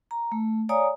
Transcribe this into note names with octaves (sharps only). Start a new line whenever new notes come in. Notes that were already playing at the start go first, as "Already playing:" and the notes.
A#5
A3
C#5 D5 F5 G#5 A#5 D#6